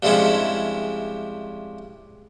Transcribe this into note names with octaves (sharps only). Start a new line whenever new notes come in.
G2 C3 F3 G#3 C#4 E4